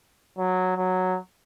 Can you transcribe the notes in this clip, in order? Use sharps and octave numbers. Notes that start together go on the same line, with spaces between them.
F#3
F#3